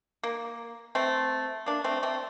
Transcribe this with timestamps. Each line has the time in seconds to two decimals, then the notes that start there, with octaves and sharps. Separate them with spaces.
0.23 A#3
0.95 A3 C4
1.66 A#3 D4
1.84 A3 C4
2.03 A3 C4